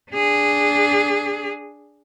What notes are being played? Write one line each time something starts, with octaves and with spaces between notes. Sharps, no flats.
D4 G#4